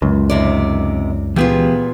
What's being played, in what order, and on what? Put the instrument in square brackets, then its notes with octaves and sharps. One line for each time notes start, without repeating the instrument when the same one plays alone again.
[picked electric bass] C#2 [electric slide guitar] F#2
[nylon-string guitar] D#2 C3 D5
[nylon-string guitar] A#2 B3 F4 [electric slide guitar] E3 G4 G#4